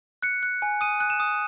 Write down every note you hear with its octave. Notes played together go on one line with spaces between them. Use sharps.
F#6 C#7
F#6
G#5
D#6 D#7
F#6
E7
D#6